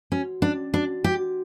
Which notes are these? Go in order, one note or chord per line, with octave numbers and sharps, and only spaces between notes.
C#4 F#4
C#4 D4
D4 F#4
F#4 G4